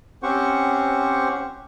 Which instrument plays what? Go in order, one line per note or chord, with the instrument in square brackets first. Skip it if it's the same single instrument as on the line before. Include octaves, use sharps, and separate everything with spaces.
[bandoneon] C4 C#4 G4 C5 F#5 C#6